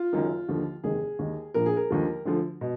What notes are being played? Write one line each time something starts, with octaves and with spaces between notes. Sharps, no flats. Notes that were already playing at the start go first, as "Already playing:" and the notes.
Already playing: F4
F#1 F#2 D#3
D#2 D3 F3
F1 D#2 D#3 G#4
D#2 D#3
A#1 A#2 F3 A#4
G#4
A#4
D#2 D3 F3
D2 D3 F3
B2